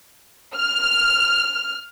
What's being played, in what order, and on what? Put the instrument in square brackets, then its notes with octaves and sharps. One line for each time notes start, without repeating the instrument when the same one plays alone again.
[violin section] F6